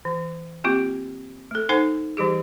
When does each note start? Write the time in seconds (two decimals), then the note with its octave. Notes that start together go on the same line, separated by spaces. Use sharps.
0.05 E3
0.64 A#3 C4 F4 G4
1.51 A3 A4
1.69 D#4 A4 C5 F#5 G#5
2.17 E3 G3 G4 G#4